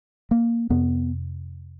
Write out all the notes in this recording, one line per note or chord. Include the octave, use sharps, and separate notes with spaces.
A#3
F2 C3 B3